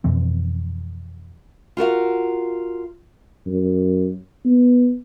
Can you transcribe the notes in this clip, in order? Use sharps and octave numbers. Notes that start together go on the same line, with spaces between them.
F2 B2 E3 C4
F4 F#4 A#4 F5
F#2
B3